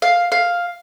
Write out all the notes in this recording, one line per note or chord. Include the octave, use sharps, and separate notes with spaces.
F5
F5